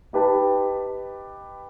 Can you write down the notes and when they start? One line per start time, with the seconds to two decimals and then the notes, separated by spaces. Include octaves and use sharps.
0.13 D#4 G4 B4 A5